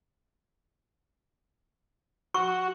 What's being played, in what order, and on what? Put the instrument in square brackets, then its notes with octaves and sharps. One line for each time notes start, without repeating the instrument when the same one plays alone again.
[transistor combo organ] F#4 [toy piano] C#6